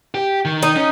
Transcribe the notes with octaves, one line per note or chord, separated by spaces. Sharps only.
G4
D#3
D#4
C#4